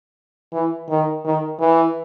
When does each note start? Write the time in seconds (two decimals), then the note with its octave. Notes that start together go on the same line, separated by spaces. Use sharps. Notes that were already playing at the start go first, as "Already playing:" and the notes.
0.53 E3
0.89 D#3
1.25 D#3
1.60 E3